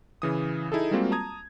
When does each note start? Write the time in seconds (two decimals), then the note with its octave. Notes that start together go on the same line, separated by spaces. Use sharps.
0.22 C#3 E3 D#6
0.72 D#4 E4 G#4 A4
0.91 G3 G#3 A#3 C4 F4 F#4
1.11 A5 A#5 D#6 G#6